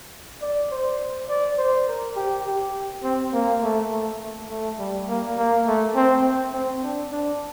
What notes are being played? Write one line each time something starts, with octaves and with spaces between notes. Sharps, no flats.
D5
C5
D5
C5
A#4
G4
G4
C4
A#3
A3
A3
A3
G3
A#3
A#3
A3
C4
C4
D4
D4